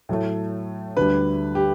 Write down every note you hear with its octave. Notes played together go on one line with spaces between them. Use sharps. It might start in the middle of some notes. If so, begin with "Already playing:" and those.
A2 F#3 A3
D2 D3 G3 B4
G4